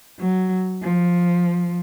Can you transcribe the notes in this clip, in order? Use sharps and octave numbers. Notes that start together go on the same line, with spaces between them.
F#3
F3